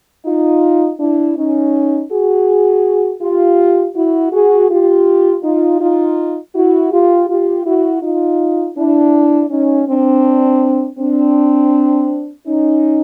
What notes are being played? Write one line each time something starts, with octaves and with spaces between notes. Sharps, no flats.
D#4 F4
D4 E4
C#4 D#4
F#4 G#4
F4 G4
E4 F#4
F#4 G#4
F4 G4
D#4 F4
D#4 F4
E4 F#4
F4 G4
F4 G4
E4 F#4
D#4 F4
D4 E4
C#4 D#4
C4 D4
C4 D4
C#4 D#4